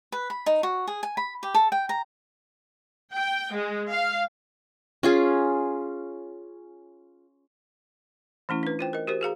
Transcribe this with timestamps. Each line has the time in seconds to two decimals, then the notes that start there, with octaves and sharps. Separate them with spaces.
0.12 B4
0.30 B5
0.46 D#4
0.63 F#4
0.88 G#4
1.03 G#5
1.17 B5
1.43 G4
1.54 A4
1.72 G5
1.89 A#5
3.12 G5
3.53 G#3
3.90 F5
5.03 C#4 F4 G#4
8.49 E3 A3 C#4 E4
8.63 D4 B4
8.79 F4 C5 G5
8.93 A#4 D#5
9.07 F#4 G4 A#4 C5
9.21 F#4 G#4 F5 A#5